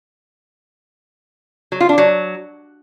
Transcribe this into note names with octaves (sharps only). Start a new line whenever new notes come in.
F#3
F4
D4
F#3